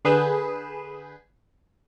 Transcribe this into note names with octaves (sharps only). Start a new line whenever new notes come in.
D3 G#4 B4 G6 E7